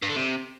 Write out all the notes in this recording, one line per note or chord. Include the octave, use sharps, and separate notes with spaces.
G2
D3
C3